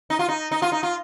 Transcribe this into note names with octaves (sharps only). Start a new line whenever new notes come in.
D#4
F4
D#4
D#4
F4
D#4
F4